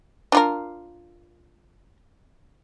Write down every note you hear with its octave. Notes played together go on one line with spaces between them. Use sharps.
D4 F4 A#4